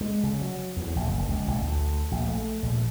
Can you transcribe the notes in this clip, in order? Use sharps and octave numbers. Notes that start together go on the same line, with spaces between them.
G#3
C#3
F#3
E2
A#1
F#1
C#2
A1
D2
A#1
A3
A#1